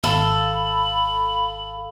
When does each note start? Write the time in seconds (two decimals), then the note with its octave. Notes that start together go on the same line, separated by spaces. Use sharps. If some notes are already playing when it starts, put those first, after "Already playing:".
0.04 G#1 A4 F5 B5